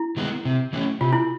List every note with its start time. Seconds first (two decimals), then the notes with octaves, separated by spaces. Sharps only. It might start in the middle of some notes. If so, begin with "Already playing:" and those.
Already playing: E4
0.17 D#3 G#3 B3
0.45 C3
0.73 E3 A3 C#4
1.01 C3 F4
1.13 E4